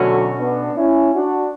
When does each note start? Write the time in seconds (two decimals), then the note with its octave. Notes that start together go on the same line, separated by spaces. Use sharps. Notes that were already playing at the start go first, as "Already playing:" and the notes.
Already playing: B2 D3 F#3 A3 C#4 F#4
0.39 B3 D4
0.77 C#4 E4
1.14 D4 F#4